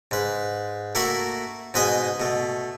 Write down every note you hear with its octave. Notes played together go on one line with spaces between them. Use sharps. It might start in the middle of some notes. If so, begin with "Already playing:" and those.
G#2 B4
A3 A#3 E4 F#4 E5 F#5
G#2 B2 B4 D#5 G#5 D#6
B2 A3